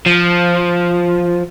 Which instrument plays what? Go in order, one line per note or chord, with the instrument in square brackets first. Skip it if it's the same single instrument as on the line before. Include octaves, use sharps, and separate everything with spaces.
[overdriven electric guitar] F3